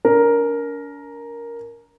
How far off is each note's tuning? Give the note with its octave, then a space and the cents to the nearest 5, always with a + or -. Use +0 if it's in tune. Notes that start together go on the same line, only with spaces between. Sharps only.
D4 -45 A#4 +5